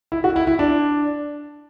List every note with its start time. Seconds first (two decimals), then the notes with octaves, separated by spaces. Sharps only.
0.12 E4
0.24 F#4
0.36 E4
0.47 E4
0.59 D4